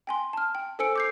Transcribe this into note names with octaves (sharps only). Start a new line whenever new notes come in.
G5 G#5 C6
A5 F6
G5
A4 C5 G#5 E6 C#7 D7
D6 G6 C7